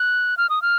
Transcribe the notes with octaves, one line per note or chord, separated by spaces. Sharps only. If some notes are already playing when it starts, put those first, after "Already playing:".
Already playing: F#6
F6
D#6
F6